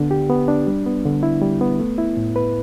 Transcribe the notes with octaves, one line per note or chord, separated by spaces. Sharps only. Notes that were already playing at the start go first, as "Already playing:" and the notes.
Already playing: D3 B3 D4
G4
B3
D4
G3
B3
D3
E4
G3
B3
A3
E4
A2
B4